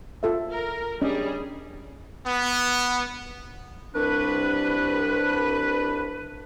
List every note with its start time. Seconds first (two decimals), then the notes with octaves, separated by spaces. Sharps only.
0.23 F4 A4 E5
0.51 A#4
1.02 G3 C#4 D4 G#4 D#5
2.26 B3
3.95 C2 D4 B4